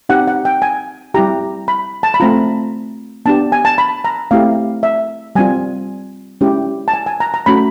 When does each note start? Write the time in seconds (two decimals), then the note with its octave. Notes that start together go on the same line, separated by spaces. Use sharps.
0.09 C4 D#4 G4 F#5
0.28 F#5
0.45 G5
0.62 G#5
1.14 G3 C4 E4 G4 A#5
1.68 B5
2.03 A5
2.14 B5
2.20 A3 C4 F4 A#5
3.25 B3 D4 G4 A5
3.52 G#5
3.65 A5
3.78 B5
4.05 A#5
4.31 A3 C4 E4 G4 F5
4.83 E5
5.35 G3 C4 F4 G#5
6.41 G#3 C#4 E4 G4
6.88 A5
6.94 G#5
7.06 G#5
7.20 A#5
7.34 A#5
7.46 A3 C#4 F#4 B5